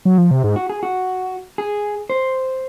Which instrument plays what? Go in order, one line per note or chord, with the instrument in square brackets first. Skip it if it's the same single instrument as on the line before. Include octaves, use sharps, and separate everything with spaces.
[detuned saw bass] F#3
F3
C3
G#2
[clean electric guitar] F#4
G#4
F#4
G#4
C5